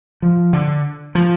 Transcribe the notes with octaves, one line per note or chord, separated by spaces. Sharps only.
F3
D3
F3